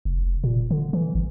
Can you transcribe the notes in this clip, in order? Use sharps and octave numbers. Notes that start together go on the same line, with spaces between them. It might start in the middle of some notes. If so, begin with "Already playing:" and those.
F1
A#2
D3
E3
G1